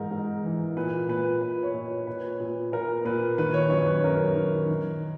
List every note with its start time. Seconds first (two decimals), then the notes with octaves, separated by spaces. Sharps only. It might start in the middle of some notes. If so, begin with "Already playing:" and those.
Already playing: G#2 E3 A#4
0.11 G#2
0.43 E3
0.76 A#2 B4
1.08 A#2 B4
1.41 A#2 B4
1.63 C#5
1.74 A#2
1.86 C#5
2.07 A#2 B4
2.40 A#2
2.72 A#2 A#4
3.05 A#2 B4
3.38 D#3 B4
3.54 C#5
3.70 F#2 C#5
3.86 B4
4.03 F#2 A#4
4.36 D#3
4.69 D#3